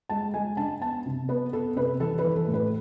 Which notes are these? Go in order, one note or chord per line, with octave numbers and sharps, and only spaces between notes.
G#3 A5
G#3 G#5
D4 A5
B3 A5
C3
B3 B4
B3 A4
C3 B4
E3 A4
B4
E3
A4
A2
B4